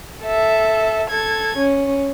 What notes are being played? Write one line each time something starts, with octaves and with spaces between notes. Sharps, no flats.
A4 E5
A4 G#6
C#4